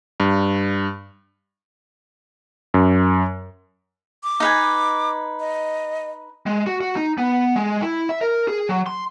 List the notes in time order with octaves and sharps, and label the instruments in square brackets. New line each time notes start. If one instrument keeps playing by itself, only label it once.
[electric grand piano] G2
F#2
[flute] D6
[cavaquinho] D#4 B4 G#5
[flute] D#5
[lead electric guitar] G#3
F#4
F#4
D#4
B3
G#3
E4
E5
A#4
G#4
F#3
C6